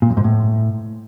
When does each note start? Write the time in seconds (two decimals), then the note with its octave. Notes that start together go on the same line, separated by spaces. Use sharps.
0.02 A#2
0.10 F#2
0.17 G#2
0.24 A2